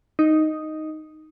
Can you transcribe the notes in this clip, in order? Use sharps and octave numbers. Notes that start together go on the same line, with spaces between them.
D#4